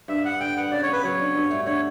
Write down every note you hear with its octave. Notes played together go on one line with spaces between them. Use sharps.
G2 E5
B3 F#5
D3 G5
B3 F#5
C#3 D5
C#5
B3 B4
F#3 C#5
D4
G2
A3
D3 C#5